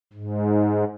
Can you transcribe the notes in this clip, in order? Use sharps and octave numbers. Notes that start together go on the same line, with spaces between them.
G#2